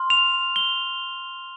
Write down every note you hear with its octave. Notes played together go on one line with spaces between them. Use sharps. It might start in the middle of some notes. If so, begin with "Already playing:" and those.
Already playing: C6 F6
F7
G7